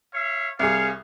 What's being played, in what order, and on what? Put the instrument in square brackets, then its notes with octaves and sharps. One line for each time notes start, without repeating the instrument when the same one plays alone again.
[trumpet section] C#5 E5 F5
[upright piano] C2 G#4 [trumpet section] C#5 F5